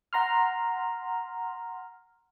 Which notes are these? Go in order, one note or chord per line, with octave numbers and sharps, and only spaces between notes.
F#5 A#5 C6 F6